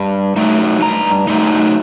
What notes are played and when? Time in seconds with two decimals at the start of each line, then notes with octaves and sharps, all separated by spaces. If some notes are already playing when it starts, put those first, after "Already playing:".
Already playing: G2
0.36 F#3 A3 D#4
0.82 G2 A#5
1.27 F#3 A3 D#4